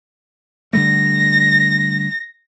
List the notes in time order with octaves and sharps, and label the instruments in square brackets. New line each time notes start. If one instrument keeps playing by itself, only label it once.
[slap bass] D3 G3 A3 [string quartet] A#6